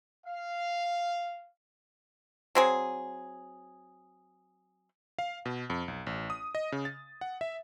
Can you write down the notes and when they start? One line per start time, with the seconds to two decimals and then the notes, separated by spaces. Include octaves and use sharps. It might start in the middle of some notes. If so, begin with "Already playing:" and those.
0.25 F5
2.55 F#3 C4 G#4
5.19 F5
5.46 B2
5.70 F2
5.88 B1
6.07 A1
6.30 D#6
6.55 D#5
6.72 C#3
6.85 A6
7.21 F#5
7.41 E5